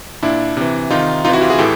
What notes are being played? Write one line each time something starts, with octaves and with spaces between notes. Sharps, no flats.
A#2 D4 E4
C3 E3
C3 D#3 D#4 F4
C3 E3 D#4 F4
E4 F#4
F4 G4
F#4 G#4
A2 E3 G4 A4